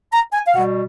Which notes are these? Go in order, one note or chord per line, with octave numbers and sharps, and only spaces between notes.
A#5
G#5
F5
B2 G3 F#5